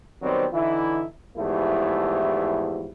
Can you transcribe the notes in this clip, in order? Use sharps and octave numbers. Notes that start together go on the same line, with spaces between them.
D#3 F#3 G3 B3 C4
D3 E3 D#4 E4
E2 G#2 F3 A3 E4 G4